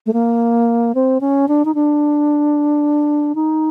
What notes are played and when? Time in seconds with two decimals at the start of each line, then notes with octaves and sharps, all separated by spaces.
0.06 A3
0.13 A#3
0.95 C4
1.21 C#4
1.48 D4
1.65 D#4
1.75 D4
3.35 D#4